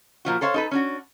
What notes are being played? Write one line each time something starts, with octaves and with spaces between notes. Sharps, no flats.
A#2 F3 F#4
A4 C5 C#5 F5
D#4 A4 B4
C#4 D4 F#4